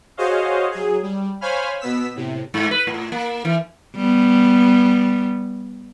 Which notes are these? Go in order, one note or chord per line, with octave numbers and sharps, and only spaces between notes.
F#4 G#4 C5 C#5 D#5 F5
F#3 G#4
G3
C5 C#5 F5 G#5 B5 F6
B2 B3 E6 B6
A2 C3
G#2
B4
A2
A#3
E3
G3 B3